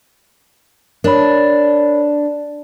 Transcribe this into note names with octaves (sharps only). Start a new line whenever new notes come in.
D4 A#4 C#5 B5